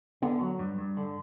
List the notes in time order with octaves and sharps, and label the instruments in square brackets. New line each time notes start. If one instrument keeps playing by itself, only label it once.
[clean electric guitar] D3 [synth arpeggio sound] B3
[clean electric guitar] F#3
G2
G2
D3